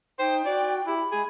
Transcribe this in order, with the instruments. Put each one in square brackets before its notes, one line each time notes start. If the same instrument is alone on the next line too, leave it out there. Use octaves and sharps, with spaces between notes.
[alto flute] D#4 [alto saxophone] C5 [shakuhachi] G5
[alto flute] F#4 [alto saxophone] D5
[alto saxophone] E4 [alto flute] G4 [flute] B5
[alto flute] G#3 [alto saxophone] G#4